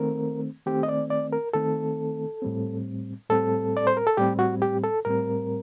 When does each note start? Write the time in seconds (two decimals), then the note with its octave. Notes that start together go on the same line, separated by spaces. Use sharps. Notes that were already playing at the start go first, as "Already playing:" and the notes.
Already playing: D#3 A3 C4 A#4
0.66 D#3 A3 C4 G4
0.83 D#5
0.88 D5
1.10 D5
1.32 A#4
1.53 D#3 A3 C4 A4
2.42 A2 G3 C4
3.30 A2 G3 C4 A4
3.77 D5
3.87 C5
3.97 A#4
4.07 A4
4.17 A2 G3 C4 G4
4.39 F#4
4.62 G4
4.83 A4
5.05 A2 G3 C4 A#4